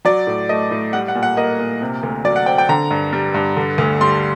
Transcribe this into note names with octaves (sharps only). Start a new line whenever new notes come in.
F#3 D5
A2
A3 D#5
A2
G3 F#5
F#5
A#2
F#5
A#3 D#5
A#2
C3
D2
F#3 D5
F#5
C4 G5
G5
D3 A#5
G2
G3
G2
D3
D2
G3 C6